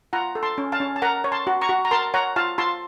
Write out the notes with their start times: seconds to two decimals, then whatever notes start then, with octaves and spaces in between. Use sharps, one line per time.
0.13 F4 F#5 A#5
0.35 A4
0.43 A5 C6
0.58 C#4
0.72 F5 A5
0.80 C#4
0.96 A5
1.02 A#4 F#5 A#5
1.24 C#5
1.32 A5 C6
1.47 F#4
1.61 A#5 C#6
1.69 F#4
1.85 A#5
1.91 A#4 A5 C6
2.14 C#5 F#5 A#5
2.36 F4 F5 A5
2.58 F4 A5 C6